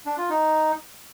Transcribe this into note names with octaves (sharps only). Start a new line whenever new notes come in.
D4
F4
D#4